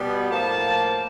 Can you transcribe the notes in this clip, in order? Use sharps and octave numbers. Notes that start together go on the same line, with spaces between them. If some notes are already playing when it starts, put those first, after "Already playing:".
Already playing: B2 G3 B3
A2 F3 A#3 A5